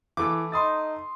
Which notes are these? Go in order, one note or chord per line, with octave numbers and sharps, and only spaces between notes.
E3 A3 D6
D#4 C6 D#6 A6